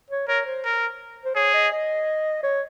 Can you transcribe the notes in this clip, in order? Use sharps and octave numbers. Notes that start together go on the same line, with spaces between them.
C#5
A#4 C#5
C5
A#4
C5
G#4 C#5
D#5
D#5
C#5